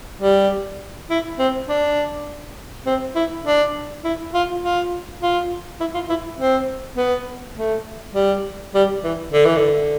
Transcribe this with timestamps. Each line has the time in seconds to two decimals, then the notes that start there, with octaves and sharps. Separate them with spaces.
0.22 G3
1.10 E4
1.39 C4
1.68 D4
2.86 C4
3.15 E4
3.45 D4
4.04 E4
4.34 F4
4.63 F4
5.21 F4
5.80 E4
5.95 F4
6.09 E4
6.40 C4
6.97 B3
7.57 A3
8.15 G3
8.74 G3
9.04 E3
9.33 D3
9.45 E3
9.57 D3